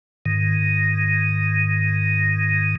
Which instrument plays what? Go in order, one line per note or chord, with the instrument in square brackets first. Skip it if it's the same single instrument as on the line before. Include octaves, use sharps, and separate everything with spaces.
[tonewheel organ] G#2 D#3